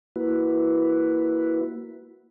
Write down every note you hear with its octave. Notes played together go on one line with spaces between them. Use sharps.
A#3 E4 F#4 B4